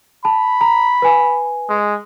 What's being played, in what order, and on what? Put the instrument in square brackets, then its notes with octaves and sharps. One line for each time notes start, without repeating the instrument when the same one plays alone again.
[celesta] A5 [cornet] B5
[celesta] A#5
B4 G#5
[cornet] G#3